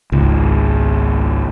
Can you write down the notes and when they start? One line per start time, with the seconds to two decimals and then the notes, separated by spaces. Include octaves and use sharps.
0.12 G#1 C#2